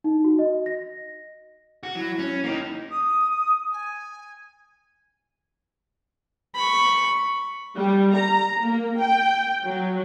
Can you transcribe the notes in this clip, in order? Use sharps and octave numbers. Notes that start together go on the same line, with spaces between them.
D#4
F#4
D#5
A#6
F#4
F#3 E4
C#4
A#3 D#4
D#6
G#5
B5 C#6
G3
A#5
A#3
G5
F#3